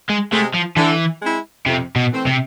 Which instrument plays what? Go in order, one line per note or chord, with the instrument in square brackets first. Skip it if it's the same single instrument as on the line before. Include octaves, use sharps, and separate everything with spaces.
[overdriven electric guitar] G#3
[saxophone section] C3 G#3 [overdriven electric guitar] A3
[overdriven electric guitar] F3
[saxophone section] D3 [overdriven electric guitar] E3
[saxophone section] G#3 C4 E4
[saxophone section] F2 [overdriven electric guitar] C3
[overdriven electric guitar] B2
[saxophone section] E3 A3 C4
[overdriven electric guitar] C3